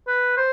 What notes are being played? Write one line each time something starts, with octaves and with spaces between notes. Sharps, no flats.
B4
C5